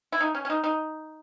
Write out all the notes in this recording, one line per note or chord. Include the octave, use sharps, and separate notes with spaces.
E4
D#4
C#4
C#4
D#4
D#4